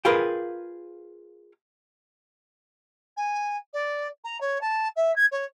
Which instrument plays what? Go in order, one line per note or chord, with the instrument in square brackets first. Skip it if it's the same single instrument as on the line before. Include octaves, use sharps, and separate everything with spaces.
[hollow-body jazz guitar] F4 G#4 A#4 B4 F5 G5
[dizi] G#5
D5
A#5
C#5
A5
E5
G#6
C#5